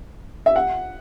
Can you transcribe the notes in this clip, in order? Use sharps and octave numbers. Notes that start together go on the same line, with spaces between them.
E5
F#5